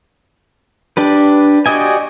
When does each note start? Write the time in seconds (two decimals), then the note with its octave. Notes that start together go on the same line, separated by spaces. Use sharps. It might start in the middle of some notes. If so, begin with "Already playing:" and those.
0.97 D4 G4 B4
1.66 F#4 G4 D5 D#5 G#5